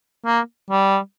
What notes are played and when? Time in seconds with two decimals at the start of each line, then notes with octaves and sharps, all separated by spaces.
0.26 A#3
0.70 G3